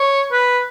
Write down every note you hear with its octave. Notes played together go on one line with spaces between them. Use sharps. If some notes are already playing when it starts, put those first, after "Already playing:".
Already playing: C#5
B4